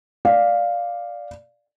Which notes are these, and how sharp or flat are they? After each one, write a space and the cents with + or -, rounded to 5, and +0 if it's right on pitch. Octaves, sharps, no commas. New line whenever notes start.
D5 +0 F5 +0